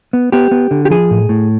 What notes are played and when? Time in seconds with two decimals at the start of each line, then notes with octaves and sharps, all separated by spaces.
0.13 B3
0.32 B3 G4
0.51 B3
0.71 D3
0.85 G4
0.90 F3 G#4
1.11 A2
1.29 A2